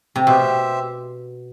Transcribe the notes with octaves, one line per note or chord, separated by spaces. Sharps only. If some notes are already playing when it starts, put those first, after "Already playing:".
C3
B2 G4 C5 E5